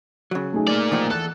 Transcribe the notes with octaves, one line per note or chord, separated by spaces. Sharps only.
C#3 F#3
A3 D#4 G#4
A#3 D5
B2 D#3 F3
E2 A4 F#6